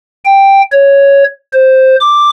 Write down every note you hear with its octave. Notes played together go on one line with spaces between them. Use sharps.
G5
C#5
C5
D6